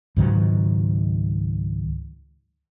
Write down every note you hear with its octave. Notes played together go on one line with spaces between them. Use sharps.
C#2 G#2 D#3 F#3